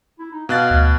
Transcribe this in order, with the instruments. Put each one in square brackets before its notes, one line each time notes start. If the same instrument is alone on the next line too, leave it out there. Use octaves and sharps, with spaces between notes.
[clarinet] E4
D#4
[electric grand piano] B2 F#6 A6 [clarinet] F5
[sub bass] D2